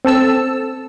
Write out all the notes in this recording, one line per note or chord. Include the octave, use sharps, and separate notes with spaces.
C4 A4 A5 E6